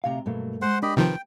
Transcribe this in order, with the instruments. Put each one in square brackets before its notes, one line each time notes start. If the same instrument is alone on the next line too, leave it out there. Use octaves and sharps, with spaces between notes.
[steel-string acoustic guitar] D2 C3 A#5 [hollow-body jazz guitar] F5
[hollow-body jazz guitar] G2 A3 A#3 [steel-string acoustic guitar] B2 F#3
[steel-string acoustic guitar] G#3 [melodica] C5 F#5 C6
[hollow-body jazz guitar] D4 A#4 [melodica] G4 D#5 B5
[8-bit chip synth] C3 D#3 F3 [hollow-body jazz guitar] B4 [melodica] G5